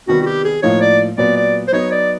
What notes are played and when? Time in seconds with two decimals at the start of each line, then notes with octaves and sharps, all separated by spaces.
0.07 C3 D#3 G3 B3 F#4
0.22 F#4
0.26 G4
0.45 G#4
0.63 A2 F3 A#3 D#4 C#5
0.81 D5
1.18 A#2 F#3 B3 D5
1.36 D5
1.68 C5
1.72 F#3 B3 D#4 C#5
1.91 D5